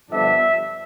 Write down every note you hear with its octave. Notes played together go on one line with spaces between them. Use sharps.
G2 D3 F3 B3 D4 E5